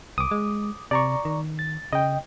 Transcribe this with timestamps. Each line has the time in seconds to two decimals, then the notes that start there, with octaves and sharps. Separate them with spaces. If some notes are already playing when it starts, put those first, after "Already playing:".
0.18 C2 D6 D#6
0.31 G#3
0.91 C3 D5 A#5 C#6
1.25 D#3
1.59 A6
1.93 C#3 D#5 G5